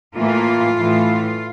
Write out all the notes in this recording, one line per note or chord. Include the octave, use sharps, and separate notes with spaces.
A2 E3 A#3 F4
A2 E3 A3